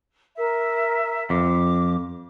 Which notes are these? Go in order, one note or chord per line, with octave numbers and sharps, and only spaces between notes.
A#4 E5
F2 D6